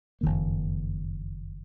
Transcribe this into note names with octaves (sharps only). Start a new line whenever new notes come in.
F#1 F2 D#3 A#3